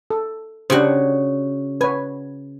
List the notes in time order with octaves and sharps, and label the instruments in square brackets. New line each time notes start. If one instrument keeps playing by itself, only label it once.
[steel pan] A4
[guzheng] C#3 F#4 [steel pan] D4 G4 C5
[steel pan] B4 C#5 [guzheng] G#5